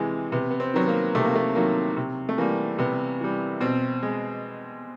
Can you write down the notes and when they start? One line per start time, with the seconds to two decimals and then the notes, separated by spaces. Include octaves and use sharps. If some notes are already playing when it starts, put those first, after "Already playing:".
Already playing: C3 E3 G#3
0.32 C3 B3
0.51 B3
0.60 C4
0.74 D#3 F#3 B3
0.88 A#3
1.15 C3 A3
1.25 A#3
1.35 A3
1.55 D#3 F#3 A#3
1.97 C3
2.29 A3
2.38 E3 G3 A#3
2.79 C3 B3
3.20 E3 G3
3.61 B2 C4
4.02 G#3